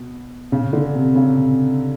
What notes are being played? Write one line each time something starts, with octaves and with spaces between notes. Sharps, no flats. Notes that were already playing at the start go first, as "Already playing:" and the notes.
Already playing: B2
C#3
D3
C3
C#3
C3